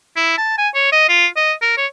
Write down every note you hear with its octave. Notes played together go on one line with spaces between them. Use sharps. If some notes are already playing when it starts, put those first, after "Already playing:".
E4
A5
G#5
C#5
D#5
F4
D#5
A#4
C#5